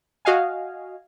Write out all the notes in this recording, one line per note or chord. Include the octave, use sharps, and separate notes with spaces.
F#4 D#5 F5 G#5